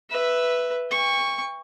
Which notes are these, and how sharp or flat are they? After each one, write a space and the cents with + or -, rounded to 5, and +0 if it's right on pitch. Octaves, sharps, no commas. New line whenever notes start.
B4 +0 E5 +0
G5 +40 C#6 +0